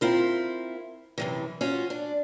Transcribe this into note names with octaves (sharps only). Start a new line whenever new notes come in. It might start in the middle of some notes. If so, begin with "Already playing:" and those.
C4 E4 F4 A#4
F#2 C3 E3
C#4 F4 F#4
D4